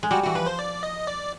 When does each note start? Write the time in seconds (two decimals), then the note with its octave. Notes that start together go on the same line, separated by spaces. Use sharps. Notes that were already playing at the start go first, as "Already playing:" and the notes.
0.03 G#3
0.11 G3 F#4
0.23 E3 F#4
0.35 F3 B4
0.46 C5
0.59 D5
0.83 D#5
1.07 D5